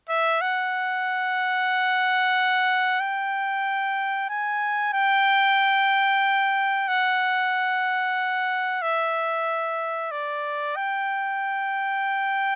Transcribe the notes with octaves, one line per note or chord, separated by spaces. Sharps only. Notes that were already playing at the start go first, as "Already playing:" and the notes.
E5
F#5
G5
G#5
G5
F#5
E5
D5
G5